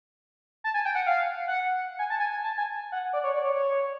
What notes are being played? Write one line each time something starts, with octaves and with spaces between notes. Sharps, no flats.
A5
G#5
G5
F#5
F5
F#5
G#5
A5
G#5
G#5
A5
G#5
F#5
D5
C#5
D5
C#5
C#5